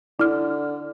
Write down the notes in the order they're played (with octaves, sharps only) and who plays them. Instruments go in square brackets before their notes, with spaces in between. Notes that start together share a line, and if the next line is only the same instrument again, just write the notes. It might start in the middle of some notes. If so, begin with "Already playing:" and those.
[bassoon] D3 [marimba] E4 F6